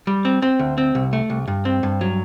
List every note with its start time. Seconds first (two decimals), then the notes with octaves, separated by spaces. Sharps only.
0.07 G3
0.25 C4
0.42 C4
0.59 D2
0.78 C4
0.95 C2
1.13 A3
1.30 C2
1.47 G2
1.65 C4
1.83 G2
2.01 F#3